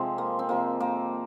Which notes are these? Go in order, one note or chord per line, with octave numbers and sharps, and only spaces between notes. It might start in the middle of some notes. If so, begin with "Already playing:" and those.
Already playing: C3 F3 G#3 C4
A#3
C4
C3 F3 G#3 A#3
A#3